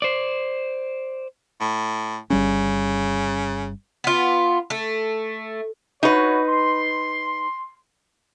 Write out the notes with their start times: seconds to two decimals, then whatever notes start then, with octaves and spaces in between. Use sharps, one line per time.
0.02 C5 D5
1.60 A2
2.30 G1 C#3 G3 C#4
4.04 B3 F4
4.70 A3
6.03 D#4 F#4 B4 C#5
6.48 C6